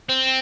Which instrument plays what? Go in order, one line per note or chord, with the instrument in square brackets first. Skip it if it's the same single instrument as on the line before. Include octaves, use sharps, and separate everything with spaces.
[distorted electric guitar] C4